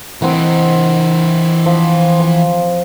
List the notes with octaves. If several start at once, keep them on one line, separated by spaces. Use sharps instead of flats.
E3 C4 A#4 D#5 F#5
F3
F3